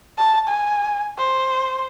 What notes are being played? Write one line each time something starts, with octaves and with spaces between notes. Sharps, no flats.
A5
G#5
C5